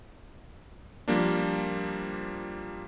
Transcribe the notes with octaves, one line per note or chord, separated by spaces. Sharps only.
F3 G3 A#3 D4